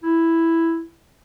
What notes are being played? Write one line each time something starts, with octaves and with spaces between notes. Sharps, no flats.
E4